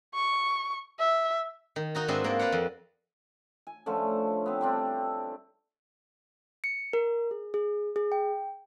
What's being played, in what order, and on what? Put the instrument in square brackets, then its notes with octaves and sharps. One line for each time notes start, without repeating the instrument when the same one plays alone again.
[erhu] C#6
E5
[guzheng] D#3
D#4 F#4 A#5
G#2 C4 D4 B4 D#5 E5
A#3 D5
B4 D5 F5 F#5
F2
[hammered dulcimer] G#5
D3 F3 A3 C#4
B3 C4
G3 C4 D4 E4
[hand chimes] C#7
A#4
G#4
G#4
G#4
G5